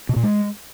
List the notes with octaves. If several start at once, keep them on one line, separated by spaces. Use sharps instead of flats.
B2
A#2
G#3